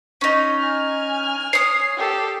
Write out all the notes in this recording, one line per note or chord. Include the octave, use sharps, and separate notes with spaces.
C#4 D#4
G#5 F6
C#5 D#6 C7
G4 A4